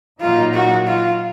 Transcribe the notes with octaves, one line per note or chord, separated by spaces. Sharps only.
A#2 F#3 A#3 D#4 F4
F#4
F4